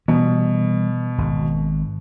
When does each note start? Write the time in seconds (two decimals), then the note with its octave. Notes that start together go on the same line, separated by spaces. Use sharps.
0.08 B2 E3 G3
1.18 G#1